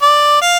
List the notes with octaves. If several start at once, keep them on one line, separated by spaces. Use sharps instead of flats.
D5
F5